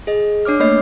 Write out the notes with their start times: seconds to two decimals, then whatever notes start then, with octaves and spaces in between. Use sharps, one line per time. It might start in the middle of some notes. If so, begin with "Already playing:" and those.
0.07 G#4 D#5
0.45 D4 C#5 D6 F6
0.60 A3 A#3 C#5 D#5 C7